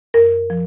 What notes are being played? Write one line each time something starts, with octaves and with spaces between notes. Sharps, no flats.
F#2 A#4
F3